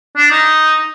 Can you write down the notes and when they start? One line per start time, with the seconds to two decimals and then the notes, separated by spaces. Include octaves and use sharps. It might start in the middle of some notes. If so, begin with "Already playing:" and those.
0.17 D4
0.31 D#4